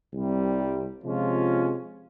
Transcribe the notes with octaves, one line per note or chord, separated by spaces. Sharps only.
C2 C3 G3
C3 F3 G#3 C#4 F4